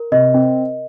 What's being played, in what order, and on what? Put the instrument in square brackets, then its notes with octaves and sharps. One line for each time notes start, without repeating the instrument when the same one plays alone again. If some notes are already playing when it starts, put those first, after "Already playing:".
Already playing: [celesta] A#4
[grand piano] C3 [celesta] D#5
[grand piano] C4